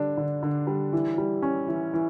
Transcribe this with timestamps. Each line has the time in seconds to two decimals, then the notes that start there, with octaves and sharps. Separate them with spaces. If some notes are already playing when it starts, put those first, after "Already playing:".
Already playing: D3 G3 D4
0.17 D3
0.43 D3
0.67 G3
0.93 E3
1.18 G3
1.42 C#4
1.68 E3
1.94 E3